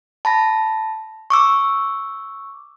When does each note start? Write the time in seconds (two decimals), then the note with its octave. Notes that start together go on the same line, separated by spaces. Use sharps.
0.25 A5 B5 A#6
1.30 C#6 D6 E6